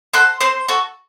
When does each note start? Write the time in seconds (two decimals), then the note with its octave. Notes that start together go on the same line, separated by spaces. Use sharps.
0.14 F#4 A4 C5 C6
0.41 C4 C5 C6
0.68 F#4 A4